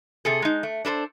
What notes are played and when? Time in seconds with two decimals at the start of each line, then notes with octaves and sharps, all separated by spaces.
0.25 C3 G#4 A4
0.42 G#3 D#4
0.63 A3
0.85 D4 A4 B4 C5